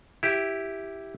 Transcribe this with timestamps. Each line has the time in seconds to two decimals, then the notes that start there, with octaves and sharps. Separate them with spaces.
0.23 E4 G4